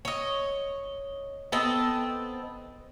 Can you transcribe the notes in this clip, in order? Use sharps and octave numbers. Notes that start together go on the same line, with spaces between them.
C#5 D#5
B3 C4 A4 D#5